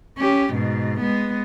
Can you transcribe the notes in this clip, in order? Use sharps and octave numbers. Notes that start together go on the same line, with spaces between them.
C#4 G4
G#2 B2
G#3 B3